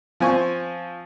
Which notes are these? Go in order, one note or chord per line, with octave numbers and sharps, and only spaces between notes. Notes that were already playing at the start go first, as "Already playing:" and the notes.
F3 C4 G#5 C#6